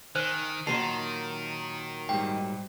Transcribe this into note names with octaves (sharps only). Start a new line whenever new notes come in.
D#3 C5 G#5 F#6
A#2 D#3 F#3 A5 C6 C7
G#2 G3 G5